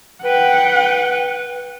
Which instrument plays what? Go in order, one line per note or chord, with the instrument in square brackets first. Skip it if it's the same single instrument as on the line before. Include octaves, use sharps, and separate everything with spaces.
[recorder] B4 [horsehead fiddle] F#5 G5